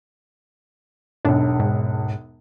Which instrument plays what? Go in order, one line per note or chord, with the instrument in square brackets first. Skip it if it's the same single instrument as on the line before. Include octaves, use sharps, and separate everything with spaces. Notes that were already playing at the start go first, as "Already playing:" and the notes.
[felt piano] E1 B1 [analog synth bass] D4
[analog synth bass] G#2